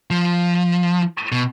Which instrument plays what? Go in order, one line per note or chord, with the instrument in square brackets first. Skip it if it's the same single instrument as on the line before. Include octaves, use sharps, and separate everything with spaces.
[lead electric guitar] F3
B2